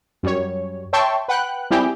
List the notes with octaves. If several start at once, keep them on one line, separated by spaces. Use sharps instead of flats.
F#2 G3 C#5
C#5 E5 G5 A5 C6 C#6
B4 F#5 G5 F#6
G3 C4 E4 G4 G#4